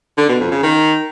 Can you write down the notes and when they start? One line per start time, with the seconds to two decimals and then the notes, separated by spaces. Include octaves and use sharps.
0.18 D3
0.29 B2
0.40 F2
0.51 C#3
0.63 D#3